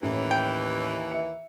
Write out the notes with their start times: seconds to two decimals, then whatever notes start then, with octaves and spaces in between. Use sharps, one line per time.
0.03 D#2 A2 E3 C#4
0.31 G5
1.11 E5 C#7